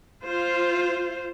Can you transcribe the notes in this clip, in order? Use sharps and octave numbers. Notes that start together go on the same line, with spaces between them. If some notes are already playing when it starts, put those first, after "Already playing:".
F4 C5